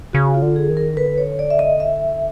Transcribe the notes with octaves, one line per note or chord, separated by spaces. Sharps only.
C#3 F#4
F4
D3
G#4
D#3
A#4
D3 B4
C#5
D5
E5
D#5
E5